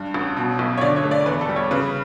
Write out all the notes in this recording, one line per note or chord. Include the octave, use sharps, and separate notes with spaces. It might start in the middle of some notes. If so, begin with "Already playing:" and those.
Already playing: G2
A1
B2
B1
C#5
D3 D5
C#5
A3
D5
E2 B4
A4
G3
C#5
C#3 B4